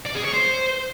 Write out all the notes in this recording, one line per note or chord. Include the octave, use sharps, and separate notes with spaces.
D5
G#4
C#5
C5